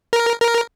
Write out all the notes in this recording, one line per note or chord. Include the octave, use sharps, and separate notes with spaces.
A#4
A#4